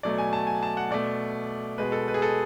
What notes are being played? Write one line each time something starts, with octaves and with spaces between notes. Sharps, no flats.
B2 F#3 A3 D5
G#5
A5
G#5
A5
F#5
B2 A3 D5
B2 G#3 B4
A4
B4
G#4
A4